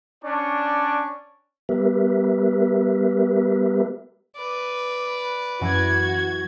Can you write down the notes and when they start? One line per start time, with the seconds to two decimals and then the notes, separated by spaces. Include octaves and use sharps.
0.24 C#4 D4 D5 C#6
1.69 G3 B3 G4 A#4 B4 E5
4.36 B4 D5
5.61 F#2 E3 F#4 G#6